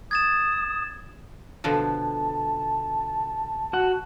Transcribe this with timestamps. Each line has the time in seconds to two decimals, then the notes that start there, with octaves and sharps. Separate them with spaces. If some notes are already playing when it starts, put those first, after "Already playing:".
0.11 D#6 G#6 A6 E7
1.64 B2 D3 F3 A5
3.73 F#4 F#5